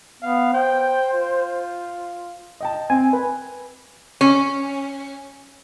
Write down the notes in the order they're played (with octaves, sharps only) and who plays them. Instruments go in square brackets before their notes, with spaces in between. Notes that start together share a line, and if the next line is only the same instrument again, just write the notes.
[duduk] B3 [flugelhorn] F5
[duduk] C5 [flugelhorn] G5
[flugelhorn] F4
[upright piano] D#5 G5 A5
[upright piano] C4 [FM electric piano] G#5
[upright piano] B4
[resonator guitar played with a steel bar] C#4